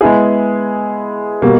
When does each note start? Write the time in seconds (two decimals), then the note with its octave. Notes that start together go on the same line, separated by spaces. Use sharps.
0.01 G#3 B3 E4 G#4
1.42 B2 G3 A#3